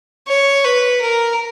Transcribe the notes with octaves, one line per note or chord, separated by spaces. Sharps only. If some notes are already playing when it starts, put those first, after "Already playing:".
C#5
B4
A#4